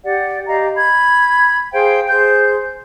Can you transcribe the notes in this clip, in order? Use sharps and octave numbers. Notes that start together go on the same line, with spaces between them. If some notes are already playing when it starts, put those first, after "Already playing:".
G4 D5 F#5
G4 D#5 F5 A#5
B5 G#6
G#4 C5 F5 G5
G#4 C5 G6